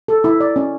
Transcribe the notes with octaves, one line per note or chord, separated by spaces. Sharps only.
A4
E4
D5
C#4